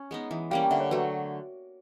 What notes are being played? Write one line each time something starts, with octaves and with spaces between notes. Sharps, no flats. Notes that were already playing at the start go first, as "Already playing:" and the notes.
Already playing: C#4
G#3 B3 D#4
E3
G3 A#3 C#4 F5 G5
G5
D3 E5 F#5
C#5
F#3 A3 B4